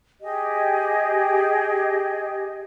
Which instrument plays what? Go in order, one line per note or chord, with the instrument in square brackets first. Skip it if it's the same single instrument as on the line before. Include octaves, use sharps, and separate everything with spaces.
[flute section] G4 G#4 D#5